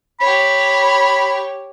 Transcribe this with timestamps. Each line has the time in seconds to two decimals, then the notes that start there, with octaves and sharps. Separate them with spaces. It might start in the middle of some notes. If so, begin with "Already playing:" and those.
0.21 G4 C#5 B5